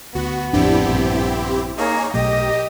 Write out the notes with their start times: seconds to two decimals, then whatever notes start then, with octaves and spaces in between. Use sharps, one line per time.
0.15 D2 B3 F#4
0.53 A1 F2 A2 C4 D4 E4 G4
0.88 A#1 G2
1.77 A#3 D#4 G#4 C#5
2.14 B1 B2 A3 G4 D#5